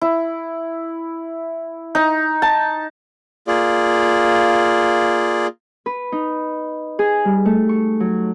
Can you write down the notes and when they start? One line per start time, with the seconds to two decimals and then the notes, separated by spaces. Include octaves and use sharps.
0.01 E4
1.95 D#4
2.42 A5
3.47 A#3 F4 G#4 D5
5.86 B4
6.12 D#4
6.99 G#4
7.25 G3
7.45 A3
7.69 C#6
8.00 F#3